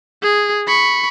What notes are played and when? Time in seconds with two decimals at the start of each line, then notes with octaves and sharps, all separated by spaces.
0.22 G#4
0.67 B5 C#6